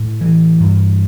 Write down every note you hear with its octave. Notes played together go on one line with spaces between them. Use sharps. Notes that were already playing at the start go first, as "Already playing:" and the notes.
Already playing: A2
E3
G2